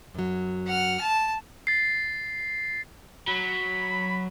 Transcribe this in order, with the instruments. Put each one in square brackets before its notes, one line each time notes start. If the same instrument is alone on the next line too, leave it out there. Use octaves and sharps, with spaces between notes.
[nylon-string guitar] F#2 F#3
[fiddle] F#5 F6
A5
[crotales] A6 C7
[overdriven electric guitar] F#3 [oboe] B5